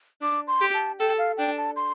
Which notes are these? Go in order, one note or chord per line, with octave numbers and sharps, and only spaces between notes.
D4 D6
C6
G4
A5
A4 G5
F5
D4 G5
A5
C6